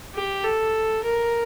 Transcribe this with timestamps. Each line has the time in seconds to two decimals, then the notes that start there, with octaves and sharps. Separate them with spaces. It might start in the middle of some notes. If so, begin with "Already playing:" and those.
0.15 G4
0.44 A4
1.04 A#4